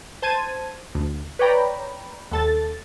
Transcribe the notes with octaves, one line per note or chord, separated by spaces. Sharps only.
C5 A5 G#6 D#7
D2
B4 C#5 D5 G5 A#5 B5
D#2 A4 A6